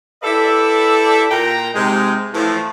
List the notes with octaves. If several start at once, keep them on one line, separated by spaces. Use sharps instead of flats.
E4 G4 A4 B4 D5 E5
A#2 G5 A#5
C3 G#3 D#4
A2 E3 F3